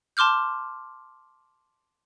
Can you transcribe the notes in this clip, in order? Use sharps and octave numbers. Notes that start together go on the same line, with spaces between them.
A5 C6 D6 F6 G6